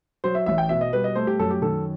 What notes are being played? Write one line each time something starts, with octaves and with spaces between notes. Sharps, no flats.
F#3 C5
E5
A1 E5
G5
B2 E5
D#5
G3 B4
D#5
A3 C5
G4
F#2 A4
G4
D#3 A4